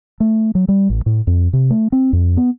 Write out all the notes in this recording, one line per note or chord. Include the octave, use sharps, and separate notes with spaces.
A3
F#3
G3
A1
A2
F2
C3
A3
C4
F2
B3